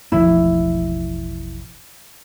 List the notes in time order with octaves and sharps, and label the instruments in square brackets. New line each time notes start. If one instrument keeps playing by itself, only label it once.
[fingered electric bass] E1 A1 F3 [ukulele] E4